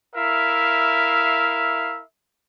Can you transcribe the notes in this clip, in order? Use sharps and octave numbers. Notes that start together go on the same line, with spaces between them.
E4 A#4 E5 F5